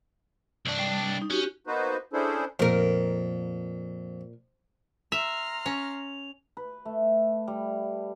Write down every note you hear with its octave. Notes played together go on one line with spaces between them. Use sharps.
C2 D4 C#6
G3
C#4 D#4
C#4 F#4 G4
A#3 B3 D#4 F#4 B4 C5
C#4 D4 E4 G#4 A4 C5
F2 A#2 A#4
E5 A#5 C6 F6 F7
C#4
B4
A3
G3